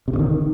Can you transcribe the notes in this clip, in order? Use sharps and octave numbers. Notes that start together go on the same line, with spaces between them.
C3
C#3
D#3